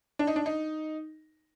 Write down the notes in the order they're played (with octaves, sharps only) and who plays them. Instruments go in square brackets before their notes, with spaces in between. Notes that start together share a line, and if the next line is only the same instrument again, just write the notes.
[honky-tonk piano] D4
D#4
D4
D#4